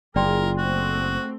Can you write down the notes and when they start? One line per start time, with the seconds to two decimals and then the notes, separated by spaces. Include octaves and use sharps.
0.16 F#1 F4 G#4 A#4 D5 G5 C6
0.58 A3 C4 F#4